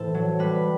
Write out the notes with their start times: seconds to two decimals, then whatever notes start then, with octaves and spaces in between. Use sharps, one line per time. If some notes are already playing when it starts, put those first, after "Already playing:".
Already playing: A2 E3 A4 C5
0.14 F#3
0.39 G3 B4